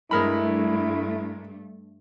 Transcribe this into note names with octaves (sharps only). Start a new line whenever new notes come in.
G2 G#3 A3 E4 A#4 B5